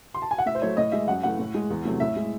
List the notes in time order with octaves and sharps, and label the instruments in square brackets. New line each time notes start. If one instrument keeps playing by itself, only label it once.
[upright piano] C6
A5
G#5
F#5
A2 E5
C5
F#3 A3 C#5
A2 D#5
G#3 E5
F#2 F#5
E3 A3 F#5
A2
G#3
E2
C3 F#3 A3
A2 E5
G#3